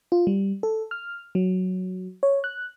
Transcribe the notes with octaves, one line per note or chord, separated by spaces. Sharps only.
F4
G3
A4
F6
F#3
C#5
F#6